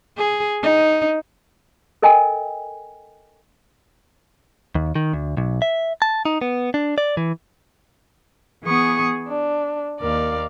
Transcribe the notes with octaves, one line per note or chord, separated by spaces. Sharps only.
G#4
D#4
A4 A#4 D#5 G5 G#5
D#2
D#3
D2
B1
E5
A5
D#4
B3
D4
D5
E3
E3 B3 G#4 C#6 D#6
D4
D#2 A#4 D5 F5